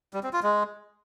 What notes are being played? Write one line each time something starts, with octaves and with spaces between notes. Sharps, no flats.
G3
C4
F4
G#3